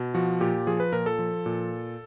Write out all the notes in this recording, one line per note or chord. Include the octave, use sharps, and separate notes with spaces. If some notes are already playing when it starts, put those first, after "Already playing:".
Already playing: B2
F3 F#4
A#2 G4
F3 G#4
B4
A#2 A#4
A4
F3
A#2